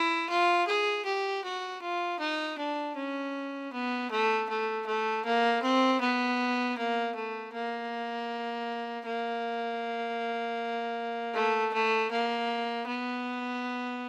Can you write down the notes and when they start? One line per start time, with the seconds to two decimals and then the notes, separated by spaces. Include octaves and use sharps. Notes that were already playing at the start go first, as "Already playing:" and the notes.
Already playing: E4
0.29 F4
0.67 G#4
1.05 G4
1.44 F#4
1.81 F4
2.19 D#4
2.58 D4
2.96 C#4
3.72 B3
4.10 A3
4.49 A3
4.86 A3
5.25 A#3
5.62 C4
6.01 B3
6.77 A#3
7.15 A3
7.53 A#3
9.05 A#3
11.34 A3
11.73 A3
12.11 A#3
12.87 B3